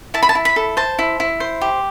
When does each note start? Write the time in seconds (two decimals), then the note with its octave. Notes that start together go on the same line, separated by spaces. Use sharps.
0.14 E4 A5
0.23 B5
0.29 A5
0.35 E4
0.45 B5
0.56 A4
0.77 C5 A5
0.99 E4
1.20 E4
1.40 C5
1.61 G4